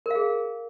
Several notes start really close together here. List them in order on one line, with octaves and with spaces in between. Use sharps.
A#4 F5 G#4